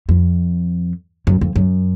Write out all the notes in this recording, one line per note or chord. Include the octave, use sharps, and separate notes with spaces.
F2
F#2
F2
F#2